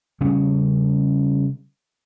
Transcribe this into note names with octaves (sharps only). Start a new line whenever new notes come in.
C#3 G3 C#4